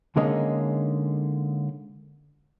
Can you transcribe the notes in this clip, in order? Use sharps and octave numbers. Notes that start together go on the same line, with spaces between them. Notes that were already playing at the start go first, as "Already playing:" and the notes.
D3 G#3 A#3 C#4 D#4 G#4